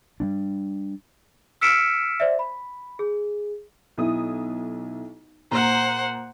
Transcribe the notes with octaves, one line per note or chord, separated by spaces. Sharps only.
G3 B3 D4
E6 F6 B6 C#7 D7 E7
C5 D5 E5
B5
G#4
B1 E4 D#6
A#2 C5 F#5 A#5